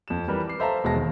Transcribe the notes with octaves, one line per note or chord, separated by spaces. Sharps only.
F2 E7
E3 G3 A#4 B4
B5 D6 C7
A4 C5 E5 F5 A5 A#5
E1 G#3 B3 A5 A#6
D#2